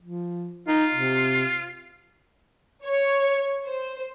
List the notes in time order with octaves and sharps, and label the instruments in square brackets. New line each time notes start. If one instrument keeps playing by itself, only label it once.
[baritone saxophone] F3
[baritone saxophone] D#4 [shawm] F4
[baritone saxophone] C3
[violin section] C#5
C5